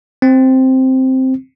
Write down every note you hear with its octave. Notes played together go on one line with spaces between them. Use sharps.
C4